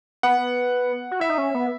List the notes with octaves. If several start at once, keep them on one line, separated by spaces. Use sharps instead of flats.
B3 F#5
F#4
E4 E5
D#4
C#4
B3